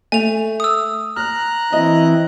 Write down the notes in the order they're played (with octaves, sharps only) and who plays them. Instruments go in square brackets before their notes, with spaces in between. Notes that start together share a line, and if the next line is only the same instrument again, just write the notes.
[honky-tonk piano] A3 [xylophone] G#5 F7
[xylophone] D#6 E6
[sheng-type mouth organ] A#5 F#6 [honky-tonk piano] F6
[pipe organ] E3 C4 E4 [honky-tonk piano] D#5